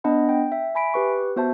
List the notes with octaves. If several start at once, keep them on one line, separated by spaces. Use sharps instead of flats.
B3 D4 D#5 F#5 B5
G5
E5
E5 G#5 B5 B6 D7
G4 B4 C#6
B3 F#4 C5 E5 A5